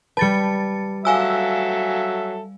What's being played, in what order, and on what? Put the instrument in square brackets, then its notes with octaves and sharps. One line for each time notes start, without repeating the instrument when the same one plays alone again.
[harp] G3 B4 [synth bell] A5 A6 C#7
[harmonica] F#3 A4 E5 [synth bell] F5 G#5 E6